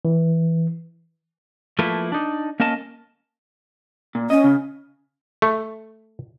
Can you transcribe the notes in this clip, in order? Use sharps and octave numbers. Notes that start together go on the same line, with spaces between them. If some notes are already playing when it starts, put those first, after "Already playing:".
E3
F3 A3 A#3 E4 A4 B4
D4 D#4
A#3 C#4 A#4 D#5 A5
A#2
C#4 D#5
C#3
A3